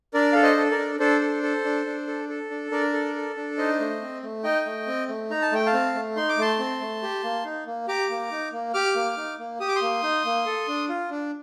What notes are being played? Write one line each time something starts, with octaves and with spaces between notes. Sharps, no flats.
D4 A#4 D5
A4 F5
C5 D#5
A4
A#4 D5
D4
D4 A4 C5
A4
A4
D4
D4
A4
A4
D4
D4 A#4 D5
A4
A4
D4
D#4 C5 D#5
A3
C4
A3
D#4 D#5 G5
A3
C4
A3
D#4 A#5
A5
A3 G5
F5 A5
C4
A3
D#4 C6
D6
A3 A5 C6
C4
A3
G4
A#3
D#4
A#3
G4 A#5 D6
A#3
D#4
A#3
G4 D6 F6
A#3
D#4
A#3
G4 D#6
D6
C6 D#6
A#3
D#4
A#3
A4
D4
F4
D4